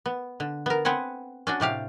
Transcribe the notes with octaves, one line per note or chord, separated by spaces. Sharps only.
B3
D3
B3 A#4
B3 C4 B4 F#5 G#5
C#4 D4 F#4
A2 C3 G4 F5